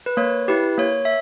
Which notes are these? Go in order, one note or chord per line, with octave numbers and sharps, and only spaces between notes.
B4
A#3 C#5
E4 G4 B4
A#3 C#5
E5